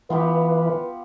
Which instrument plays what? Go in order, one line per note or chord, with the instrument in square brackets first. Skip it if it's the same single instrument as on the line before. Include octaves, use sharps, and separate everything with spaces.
[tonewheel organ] E3 [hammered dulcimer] B3 F4 G4 [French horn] B4